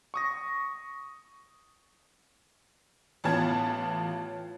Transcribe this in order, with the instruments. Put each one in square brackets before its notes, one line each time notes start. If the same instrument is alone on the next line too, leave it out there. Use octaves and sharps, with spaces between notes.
[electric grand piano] C#6 D#6 A#6
[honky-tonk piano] A1 B3 F4 A5 G#6